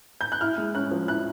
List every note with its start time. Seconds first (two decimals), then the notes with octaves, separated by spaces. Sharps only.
0.21 G6
0.32 F#6
0.41 E4 F6
0.58 G#3
0.75 C#4 F#6
0.91 F3
1.08 E4 F#6